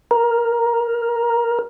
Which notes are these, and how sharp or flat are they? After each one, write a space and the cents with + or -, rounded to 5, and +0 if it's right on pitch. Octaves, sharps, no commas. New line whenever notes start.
A#4 +10